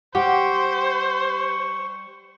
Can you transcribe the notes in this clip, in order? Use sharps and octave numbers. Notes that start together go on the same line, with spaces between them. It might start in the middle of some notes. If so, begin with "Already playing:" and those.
G3 G4 C5 F#5 C#6